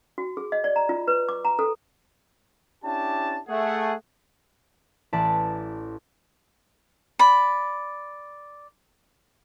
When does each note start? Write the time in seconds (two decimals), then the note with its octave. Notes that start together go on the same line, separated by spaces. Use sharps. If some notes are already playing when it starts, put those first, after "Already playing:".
0.18 F#4
0.37 G#4
0.52 D#5
0.64 D5
0.76 A#5
0.89 F4
1.08 B4
1.29 D6
1.45 A#5
1.59 A4
2.85 C#4 D4 E4 G4 A5
3.48 A3 G#4 F#5
5.13 A1 B4 D5 A5 B6
7.19 D5 B5